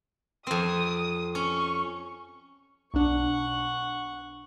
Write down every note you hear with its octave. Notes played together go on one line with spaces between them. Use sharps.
F2 C4 D#6
C#4 C#6
B1 D4 F#5 C#6